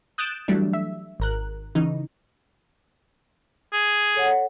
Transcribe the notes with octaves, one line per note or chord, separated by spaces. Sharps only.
D#6 F#6 G6 A6 D7 E7
E3 F#3 G3 A3 D4
E5
G#1 A#4 F#6
C#3 E3 D#4
G#4
A4 C#5 F#5